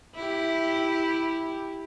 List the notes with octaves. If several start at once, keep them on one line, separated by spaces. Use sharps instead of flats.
E4 G4